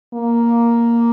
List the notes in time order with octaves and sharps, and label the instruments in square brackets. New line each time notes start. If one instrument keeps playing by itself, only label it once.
[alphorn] A#3